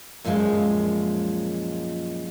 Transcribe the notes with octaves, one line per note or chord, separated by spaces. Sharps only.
F#2 A#2 F3 G3 G#3